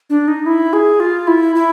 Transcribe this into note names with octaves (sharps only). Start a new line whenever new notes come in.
D4
D#4
E4
G#4
F4
E4
E4